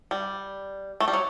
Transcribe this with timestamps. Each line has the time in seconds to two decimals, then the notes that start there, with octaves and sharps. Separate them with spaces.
0.11 G3
1.00 A3
1.08 G3
1.13 F#3